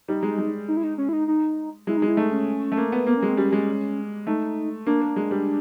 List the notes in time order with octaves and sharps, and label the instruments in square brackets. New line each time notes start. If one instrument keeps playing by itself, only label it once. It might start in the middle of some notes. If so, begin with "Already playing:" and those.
[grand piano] G3 [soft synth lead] D#4
[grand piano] G#3
G#3
[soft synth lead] D#4
E4
D#4
C#4
E4
D#4
D#4
[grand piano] G#3 [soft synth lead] E4
[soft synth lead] D#4
[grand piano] G#3
[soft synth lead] E4
[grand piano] A3 [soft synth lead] D#4
[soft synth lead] C#4
[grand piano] A3
A#3
B3
[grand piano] A#3 [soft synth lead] B3
[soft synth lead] C#4
[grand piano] G#3 [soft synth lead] C4
[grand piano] G3 [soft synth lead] C#4
[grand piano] G#3
[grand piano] A3 [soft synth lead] D#4
[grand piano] A#3 [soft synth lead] D4
[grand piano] A#3
G#3
G3